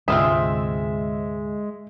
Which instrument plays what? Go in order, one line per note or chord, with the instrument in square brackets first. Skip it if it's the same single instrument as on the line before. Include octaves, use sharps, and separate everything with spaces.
[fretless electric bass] D2 G#2 C3 [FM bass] G#3 [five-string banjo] C4 F4 G#4 [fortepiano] E5